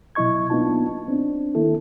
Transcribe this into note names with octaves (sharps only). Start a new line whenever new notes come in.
B2 F#3 E4 D#5 C#6 G#6
A#3 B3 D4 D#4 F4 A5
C4 D4
D#3 A#3 E4 A4